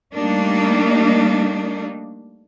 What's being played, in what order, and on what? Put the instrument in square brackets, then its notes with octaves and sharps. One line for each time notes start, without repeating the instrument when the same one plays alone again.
[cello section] G3 A3 A#3 D4 D#4